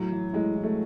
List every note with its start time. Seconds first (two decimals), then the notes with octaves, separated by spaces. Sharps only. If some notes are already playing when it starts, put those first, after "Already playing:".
Already playing: A2 F#3
0.11 E3
0.33 A2 G#3
0.56 E3
0.63 A3